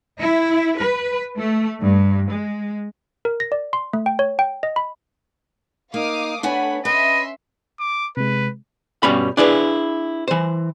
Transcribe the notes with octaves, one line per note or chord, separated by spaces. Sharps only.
E4
B4
A3
G2
G#3
A#4
A#6
D5
C6
A3
G5
C#5
G5
D#5
B5
A#3 D#4 F5 D6 D#6
A3 B3 D4 C#5 F#5 G#5 B5
C#4 B4 D#5 E5 B5 C6
D6
C3 G#3 B4
G2 B2 G3 C#4 B5
D4 E4 G#4 B4
E3 C5